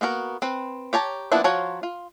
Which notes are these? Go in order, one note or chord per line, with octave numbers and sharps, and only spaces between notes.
A#3 B3 F#4 A#4
C4 B4
G4 C#5 A5 A#5
F3 A#3 B3 D4 E4
F3 F4 F#4 C#5 A#5
F4